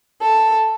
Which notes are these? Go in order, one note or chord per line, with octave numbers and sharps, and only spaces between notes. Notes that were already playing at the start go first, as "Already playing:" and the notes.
A4